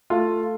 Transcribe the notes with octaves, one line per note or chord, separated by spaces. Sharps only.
A3 F4